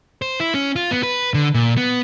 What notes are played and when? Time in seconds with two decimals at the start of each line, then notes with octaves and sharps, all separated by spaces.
0.22 C5
0.40 E4
0.54 C#4
0.76 F4
0.91 B3
1.03 B4
1.34 D3
1.54 A#2
1.77 B3